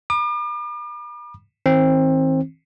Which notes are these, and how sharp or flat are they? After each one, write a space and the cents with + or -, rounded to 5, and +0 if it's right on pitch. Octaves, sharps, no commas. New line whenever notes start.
B5 -40 D6 +40
D#3 +45 C4 +20